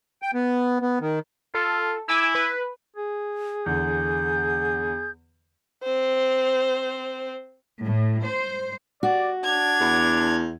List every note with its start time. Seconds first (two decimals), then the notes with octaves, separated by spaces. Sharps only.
0.22 G5
0.34 B3
0.82 B3
1.01 D#3
1.54 F4 A4
2.08 E4 G#5 D6 E6
2.35 B4
2.96 G#4
3.66 E2 D3 G6
5.83 C4 C5
7.83 A2
8.24 C5
9.03 F#4 D5
9.44 D4 G#6 F7
9.81 E2